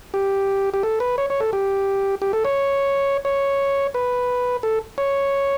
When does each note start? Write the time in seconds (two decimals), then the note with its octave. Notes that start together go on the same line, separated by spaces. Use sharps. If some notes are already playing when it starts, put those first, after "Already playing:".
0.14 G4
0.74 G4
0.83 A4
1.00 B4
1.18 C#5
1.30 C#5
1.40 A4
1.53 G4
2.22 G4
2.33 A4
2.45 C#5
3.25 C#5
3.94 B4
4.63 A4
4.98 C#5